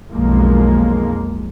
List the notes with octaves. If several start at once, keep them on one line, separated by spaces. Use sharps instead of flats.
B1 F2 F3 G#3 A#3